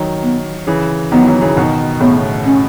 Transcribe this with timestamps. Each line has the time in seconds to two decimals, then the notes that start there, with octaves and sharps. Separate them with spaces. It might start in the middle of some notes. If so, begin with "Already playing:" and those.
Already playing: D#3 F#3
0.23 B3
0.67 C#3 E3
1.12 D#3 F#3 B3
1.22 E3
1.27 D#3 F#3
1.41 C#3 E3
1.57 B2 D#3
2.00 A2 C#3 B3
2.45 C#4